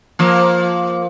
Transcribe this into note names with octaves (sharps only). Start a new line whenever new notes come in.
F3 A#3